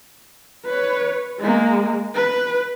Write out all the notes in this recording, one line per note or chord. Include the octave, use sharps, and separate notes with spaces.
B4 C#5
G#3 A#3
B4